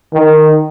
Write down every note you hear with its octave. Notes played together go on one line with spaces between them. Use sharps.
D#3